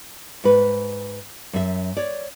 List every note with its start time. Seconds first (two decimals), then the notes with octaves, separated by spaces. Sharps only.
0.44 G#2 B4
1.53 F#2 E5
1.97 C#5 D5